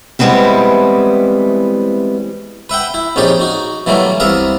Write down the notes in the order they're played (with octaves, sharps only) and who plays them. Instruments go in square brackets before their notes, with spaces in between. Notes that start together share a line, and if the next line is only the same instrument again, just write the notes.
[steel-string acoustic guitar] E3 G3 G#3 B3 C4 E4
[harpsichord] B4 E5 F#5 G5
E4
A#1 F2 C#4 D#4 G4 D5
D#4 F#4
B2 E3 F#3 G3 A3 A#3
C2 B3 A#4 E5 F5